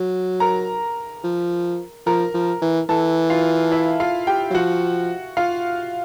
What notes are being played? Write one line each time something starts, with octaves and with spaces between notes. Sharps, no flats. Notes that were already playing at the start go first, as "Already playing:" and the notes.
Already playing: F#3
A#4 A#5
F3
F3 A#4 A#5
F3
E3
E3 A4 A5
F4 F5
E4 E5
F4 F5
G4 G5
F#3
F3 F#4 F#5
F4 F5